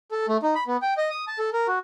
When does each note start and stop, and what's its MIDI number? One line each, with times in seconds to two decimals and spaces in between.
0.11 0.26 69
0.28 0.37 57
0.43 0.54 63
0.55 0.64 83
0.67 0.77 59
0.82 0.94 79
0.97 1.09 75
1.10 1.25 87
1.27 1.39 81
1.39 1.50 69
1.53 1.67 70
1.68 1.79 66